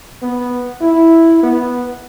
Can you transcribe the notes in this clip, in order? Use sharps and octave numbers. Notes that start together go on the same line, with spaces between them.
B3
E4
B3